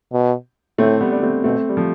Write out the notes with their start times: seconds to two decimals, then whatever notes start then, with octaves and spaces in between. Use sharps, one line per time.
0.13 B2
0.78 A2 A3 C4
1.01 G3 B3
1.12 D4
1.23 A3 C4
1.44 B2 A3 C4
1.69 G3
1.77 F3 A3